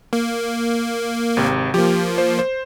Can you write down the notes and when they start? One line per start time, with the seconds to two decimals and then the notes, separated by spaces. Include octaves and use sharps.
0.13 A#3
1.37 G#1 C3
1.74 F3 A#3 G4
2.18 C5
2.39 C5